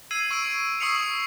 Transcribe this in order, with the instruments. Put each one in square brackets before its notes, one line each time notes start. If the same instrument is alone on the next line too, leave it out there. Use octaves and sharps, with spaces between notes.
[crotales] E6 G#6 C7 D#7
C#6 E6 D7 D#7
C#6 D#6 E6 C7 C#7 F7